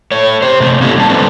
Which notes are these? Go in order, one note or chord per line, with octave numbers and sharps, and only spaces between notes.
A3 C#5
G4 C5
C3 A3 C4
A#3 C#4 D#4 E4 G4 A4
A2 G3 A5
D3 G3 C4 D4 A4 B4